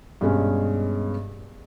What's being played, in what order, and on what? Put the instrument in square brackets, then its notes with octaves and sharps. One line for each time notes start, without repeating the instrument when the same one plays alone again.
[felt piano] G2 B2 G#3 C#4